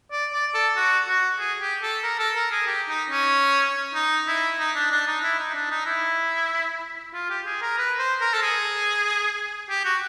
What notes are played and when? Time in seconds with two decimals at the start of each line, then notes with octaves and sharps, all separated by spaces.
0.12 D5
0.33 D5
0.54 A4
0.76 F#4
1.08 F#4
1.39 G#4
1.61 G4
1.82 A4
2.03 A#4
2.19 A4
2.36 A#4
2.52 G#4
2.67 G4
2.89 D#4
3.10 C#4
3.94 D#4
4.27 E4
4.59 D#4
4.75 D4
4.91 D4
5.07 D#4
5.23 E4
5.39 D#4
5.54 D4
5.71 D#4
5.86 E4
7.14 F4
7.30 G4
7.46 G#4
7.62 A#4
7.78 B4
7.99 C5
8.21 A#4
8.33 A4
8.42 G#4
9.70 G4
9.85 F#4